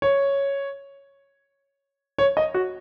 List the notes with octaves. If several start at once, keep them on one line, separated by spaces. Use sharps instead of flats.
C#5
C#5
D#5
F#4